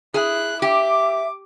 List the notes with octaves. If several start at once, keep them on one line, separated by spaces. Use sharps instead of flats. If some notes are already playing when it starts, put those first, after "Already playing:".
E4 G#4 F#6
G4 E5 D6